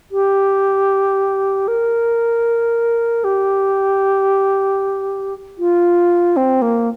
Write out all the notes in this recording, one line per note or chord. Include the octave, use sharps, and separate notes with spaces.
G4
A#4
G4
F4
C4
A#3